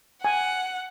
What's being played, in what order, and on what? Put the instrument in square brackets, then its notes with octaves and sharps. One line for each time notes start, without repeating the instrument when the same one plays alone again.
[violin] F#5 [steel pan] G#5